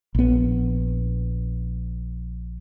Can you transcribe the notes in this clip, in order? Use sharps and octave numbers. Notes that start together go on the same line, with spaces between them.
A#1 B3